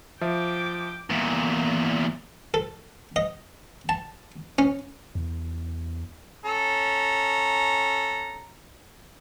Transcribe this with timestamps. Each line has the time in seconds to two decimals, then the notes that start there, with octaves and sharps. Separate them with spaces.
0.21 F3 E5 G5 D6
1.10 E2 A#2
2.54 A4
3.16 D#5
3.89 A5
4.59 C#4
5.15 E2
6.45 C#4 A4 A#5